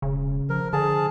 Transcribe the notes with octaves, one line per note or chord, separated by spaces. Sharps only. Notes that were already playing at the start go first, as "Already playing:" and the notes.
E1 C#3
F3 A#4
D3 G#4 A5